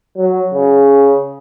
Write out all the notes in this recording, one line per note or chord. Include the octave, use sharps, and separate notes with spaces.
F#3
C#3